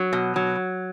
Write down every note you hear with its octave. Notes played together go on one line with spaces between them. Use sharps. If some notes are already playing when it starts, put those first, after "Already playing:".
Already playing: F#3
B2
F#3